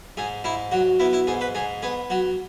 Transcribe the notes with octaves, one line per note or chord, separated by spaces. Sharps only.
G#2 G#4
G#2 E4
F#3 F#4
B3 E4
E4
G#2 G#4
B4
G#2 G#4
B3 G#4
F#3 F#4